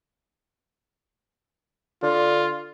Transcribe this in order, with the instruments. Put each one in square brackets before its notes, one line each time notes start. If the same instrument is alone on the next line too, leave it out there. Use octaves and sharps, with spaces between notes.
[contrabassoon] D3 [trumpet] F4